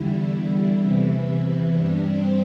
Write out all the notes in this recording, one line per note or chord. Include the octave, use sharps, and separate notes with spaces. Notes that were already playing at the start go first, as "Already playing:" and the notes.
Already playing: E2 D3 G3 E4
E2 C3 E3
G2 G3 D4
C4